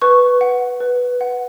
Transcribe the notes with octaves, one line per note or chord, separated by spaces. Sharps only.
B4 C#6
F#5
B4
F#5